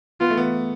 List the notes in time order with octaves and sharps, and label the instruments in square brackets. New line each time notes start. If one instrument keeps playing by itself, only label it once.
[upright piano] B3 [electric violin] F4
[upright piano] A3
B3